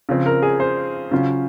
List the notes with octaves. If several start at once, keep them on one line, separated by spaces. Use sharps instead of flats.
C#3 F3 C4
A#4
G#4
C5
C#3 F#3 C#4 F4